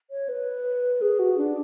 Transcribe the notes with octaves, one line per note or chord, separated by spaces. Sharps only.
C#5
B4
G#4
F#4
D4